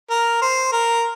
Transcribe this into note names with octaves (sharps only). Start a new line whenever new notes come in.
A#4
C5
A#4